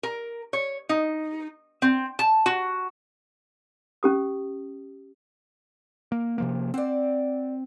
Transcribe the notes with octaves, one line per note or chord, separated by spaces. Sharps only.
A#4
C#5
D#4
C4
A5
F#4
C#4 G4 D#6
A#3
C3 F3 A#3
C4 D5 F#5